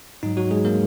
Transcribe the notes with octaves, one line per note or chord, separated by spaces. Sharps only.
G#2 F#3 D#4
F#3 F#4
G#3 G#4
A#3 A#4